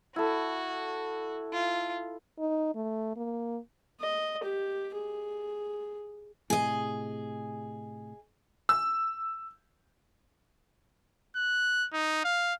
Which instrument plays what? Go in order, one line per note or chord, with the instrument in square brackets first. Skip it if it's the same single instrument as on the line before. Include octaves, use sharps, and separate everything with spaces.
[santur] E4 A4 [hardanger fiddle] F#4
[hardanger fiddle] F4
[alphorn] D#4
A3
A#3
[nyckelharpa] D#5
G4
G#4
[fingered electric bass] A2 C3 [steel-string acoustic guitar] G#4 D#5
[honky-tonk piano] E6
[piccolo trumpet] F#6
D#4
F5